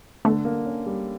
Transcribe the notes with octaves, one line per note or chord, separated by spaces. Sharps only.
D3 A3 B3
A#3
C#4
G3